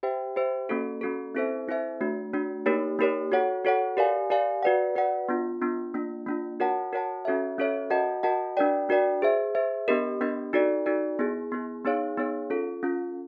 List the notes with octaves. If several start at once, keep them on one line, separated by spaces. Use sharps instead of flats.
G4 C5 E5 G5
G4 C5 E5 G5
A#3 C#4 F#4 A4
A#3 C#4 F#4 A4
C4 E4 A4 C5 E5
C4 E4 A4 C5 E5
A3 D4 F#4
A3 D4 F#4
A#3 D#4 G4 A#4 C#5
A#3 D#4 G4 A#4 C#5
F#4 A4 C#5 F#5
F#4 A4 C#5 F#5
G4 A#4 D5 F5 G#5
G4 A#4 D5 F5 G#5
F#4 B4 D5 F#5
F#4 B4 D5 F#5
B3 D4 F4
B3 D4 F4
A#3 D4 F4
A#3 D4 F4
F#4 A#4 C#5 F#5 A5
F#4 A#4 C#5 F#5 A5
C#4 F#4 A4 C#5 E5
C#4 F#4 A4 C#5 E5
F#4 A#4 D#5 F#5 A5
F#4 A#4 D#5 F#5 A5
D4 F#4 A#4 D5 G5
D4 F#4 A#4 D5 G5
G#4 C5 E5
G#4 C5 E5
B3 D4 G4 A#4 D#5
B3 D4 G4 A#4 D#5
D#4 F#4 A4 D5
D#4 F#4 A4 D5
B3 E4 G#4
B3 E4 G#4
B3 D#4 G#4 C#5 F5
B3 D#4 G#4 C#5 F5
C#4 F4 A4
C#4 F4 A4